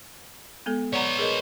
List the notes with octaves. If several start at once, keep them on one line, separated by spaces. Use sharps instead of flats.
G#3 B3 A4
B4 C#5 D5 F#5 A#5
G#4 A#4 D#5